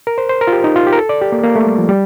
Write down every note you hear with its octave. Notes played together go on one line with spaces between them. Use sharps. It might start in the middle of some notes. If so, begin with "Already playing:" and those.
A#4
C5
C5
A#4
F4
G4
D#4
F4
G4
A#4
A4
D5
G4
A#3
A#3
A3
G3
F3
G3